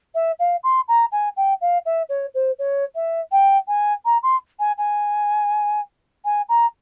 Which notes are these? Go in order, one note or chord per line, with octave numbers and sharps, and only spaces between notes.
E5
F5
C6
A#5
G#5
G5
F5
E5
C#5
C5
C#5
E5
G5
G#5
A#5
C6
G#5
G#5
G#5
A#5